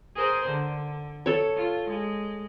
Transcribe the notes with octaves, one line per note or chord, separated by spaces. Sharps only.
G#4 A#4 C5
D3
A4 C#5
F4
G#3